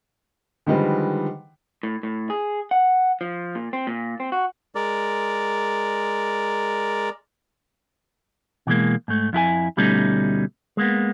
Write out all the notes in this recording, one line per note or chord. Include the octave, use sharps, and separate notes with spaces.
D3 D#3 F3 G3 G#3 B4
A2
A2
G#4
F#5
F3
A#2
C4
A#2
C4
F#4
G#3 A#4 D5
B2 E3 G#3 A#3
G#2 A3
F2 E4 G#4 G#5
D2 B2 G3 A3 C#4 D#4
G#3 A#3 B3